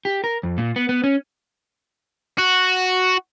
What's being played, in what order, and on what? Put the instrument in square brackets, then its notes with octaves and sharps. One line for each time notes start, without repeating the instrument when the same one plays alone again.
[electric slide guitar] G4
A#4
F2
A#2
B3
B3
C#4
[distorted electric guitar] F#4